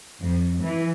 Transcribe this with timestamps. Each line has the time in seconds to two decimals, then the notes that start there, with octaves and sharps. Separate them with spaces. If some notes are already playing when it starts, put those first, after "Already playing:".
0.21 F2
0.62 E3